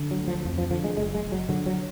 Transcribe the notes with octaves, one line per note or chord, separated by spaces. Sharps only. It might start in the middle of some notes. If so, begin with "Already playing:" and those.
Already playing: D3
F#3
D2
F3
F2 F3
F3
D3 F3
G#3
F#1 G#3
G#3
F#1
F#3
D3 F#3
F#3